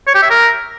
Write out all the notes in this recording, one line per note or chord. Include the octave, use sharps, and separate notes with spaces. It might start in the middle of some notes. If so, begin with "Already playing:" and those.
C#5
G4
E5
A#4